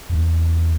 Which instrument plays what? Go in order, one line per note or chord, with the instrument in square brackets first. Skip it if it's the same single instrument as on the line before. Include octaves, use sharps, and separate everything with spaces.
[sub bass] E2